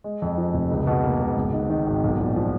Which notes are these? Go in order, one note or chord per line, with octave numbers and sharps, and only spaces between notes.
G#3
F2
F3
F1
C#2
B2
A#3
C#2
G#1
G#2
D#3
G#1
B1
A#2
F3